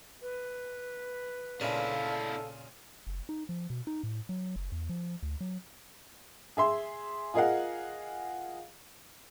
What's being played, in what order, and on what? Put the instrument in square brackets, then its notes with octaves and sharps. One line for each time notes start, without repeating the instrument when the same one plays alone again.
[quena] B4
[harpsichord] A#2 C#3 [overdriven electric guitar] D4 E4 [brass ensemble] A4 F5
[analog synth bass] F#1
D#4
F3
B2
D#4
A2
F#3
F#1
E2
F3
D2
F#3
[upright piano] G#4 E5 C6
F4 G#4 A#4 D#5 F5 F#5